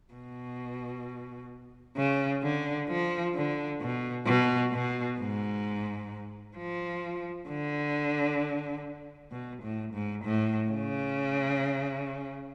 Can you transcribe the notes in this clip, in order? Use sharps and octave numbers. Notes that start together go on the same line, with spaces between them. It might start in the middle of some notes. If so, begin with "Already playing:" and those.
B2
C#3
D3
F3
D3
B2
B2
B2
G#2
F3
D3
B2
A2
G#2
A2
C#3